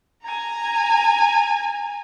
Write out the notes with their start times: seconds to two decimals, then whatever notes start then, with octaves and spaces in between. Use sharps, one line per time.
0.23 G#5 A#5